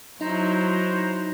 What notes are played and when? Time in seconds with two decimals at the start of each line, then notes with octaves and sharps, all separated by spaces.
0.21 F#3 D#4 E4 C5 A#5